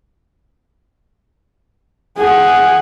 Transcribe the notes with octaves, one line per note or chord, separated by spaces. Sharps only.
G#4 F#5